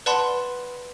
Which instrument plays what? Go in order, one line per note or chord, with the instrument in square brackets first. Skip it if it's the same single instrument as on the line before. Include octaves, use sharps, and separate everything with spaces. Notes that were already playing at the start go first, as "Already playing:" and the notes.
[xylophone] B4 D5 F#5 A5 B5 C6